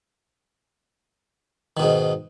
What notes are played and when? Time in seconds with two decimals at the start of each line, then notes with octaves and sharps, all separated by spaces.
1.77 D#3
1.80 B2
1.82 G#2